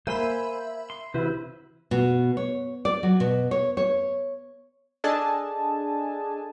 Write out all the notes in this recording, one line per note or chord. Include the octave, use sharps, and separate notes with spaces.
A#3 C5 E5 G#5 B5 C6
C6
C3 E3 E4 F#4 B4 C5
B2
C#5
D5
F#3
B2
C#5
C#5
D4 G#4 A4 D#5 G#5 A5